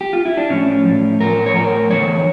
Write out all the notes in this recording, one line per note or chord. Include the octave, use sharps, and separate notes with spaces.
G4
F4
E4
D4
A2 F3 C#4
A2 F3
A2 F3 A#4
C#5
A2 F3 A#4
E2 D3 F3 C#5